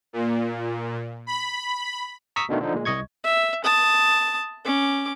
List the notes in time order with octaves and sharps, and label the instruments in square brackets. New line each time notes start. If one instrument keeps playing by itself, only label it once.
[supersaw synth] A#2
B5
[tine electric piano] A#5 C#6 D#6 E6 B6
B2 D3 D#3 A3
D3 F3 D#4
A#2 G#3
C2 D#5 C#6 G#6
[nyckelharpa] E5
A5 D#6
C#4 D6